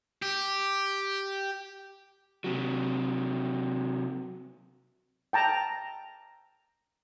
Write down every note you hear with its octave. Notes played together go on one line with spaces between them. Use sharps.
G4
C3 F#3
G5 A5 A#5